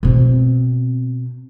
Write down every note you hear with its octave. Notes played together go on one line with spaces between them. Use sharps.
B2 C4